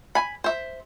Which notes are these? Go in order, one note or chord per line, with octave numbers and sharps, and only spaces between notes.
G#5 B5
C5 E5